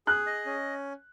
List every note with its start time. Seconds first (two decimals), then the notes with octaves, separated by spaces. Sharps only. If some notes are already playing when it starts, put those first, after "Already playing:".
0.07 G#4 F#6
0.27 D#5
0.46 C#4